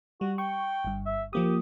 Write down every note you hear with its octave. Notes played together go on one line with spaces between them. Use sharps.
G3 F#4
G5 C#6
G1 G2
E5
F3 A#3 G4 D#6